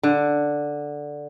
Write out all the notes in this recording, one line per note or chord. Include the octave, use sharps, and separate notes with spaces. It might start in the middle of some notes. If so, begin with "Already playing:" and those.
D3